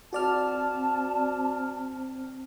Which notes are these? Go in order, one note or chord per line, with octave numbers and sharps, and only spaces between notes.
C4 F#4 D5 A5 F6